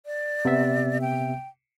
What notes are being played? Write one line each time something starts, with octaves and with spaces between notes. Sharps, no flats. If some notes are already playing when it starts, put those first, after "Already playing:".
D5
C3 B3 E5
G5